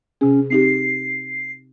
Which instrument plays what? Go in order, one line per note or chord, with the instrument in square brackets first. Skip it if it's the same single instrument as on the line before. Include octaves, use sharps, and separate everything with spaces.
[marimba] C3 G#4 [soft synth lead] C#4
[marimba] C4 D#4 G4 [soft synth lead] C7